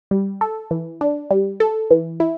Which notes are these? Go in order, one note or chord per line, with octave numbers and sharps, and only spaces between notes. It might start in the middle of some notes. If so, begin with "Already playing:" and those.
G3
A4
E3
D4
G3
A4
E3
E4